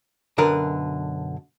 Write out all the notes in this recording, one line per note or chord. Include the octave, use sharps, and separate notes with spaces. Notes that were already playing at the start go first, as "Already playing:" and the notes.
B1 F#2 D3 A#4 B4